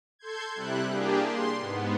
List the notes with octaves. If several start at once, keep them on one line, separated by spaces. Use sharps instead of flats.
A4 C6 G6 G#6
C3 G3 E4 F#6
A#3 D4 G4 G#4
C6
G#2 B3